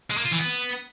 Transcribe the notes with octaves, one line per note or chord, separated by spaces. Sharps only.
G#3
A#3
F4
E3
B3